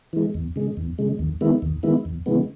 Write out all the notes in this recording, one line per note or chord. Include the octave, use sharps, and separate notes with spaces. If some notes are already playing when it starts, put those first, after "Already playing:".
E3 G#3
E2
C#3 G#3
E2
C#3 G#3
D#2
D#3 G#3 B3 E4
D#2
D#3 G#3 B3 E4
E2
C#3 E3 G#3 B3